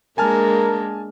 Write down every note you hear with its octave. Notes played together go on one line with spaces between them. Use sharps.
G#3 A#3 D4 A#4 G#5 A5 F6